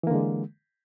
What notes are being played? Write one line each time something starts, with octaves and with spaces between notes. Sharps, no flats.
D3 E3 G#3 A#3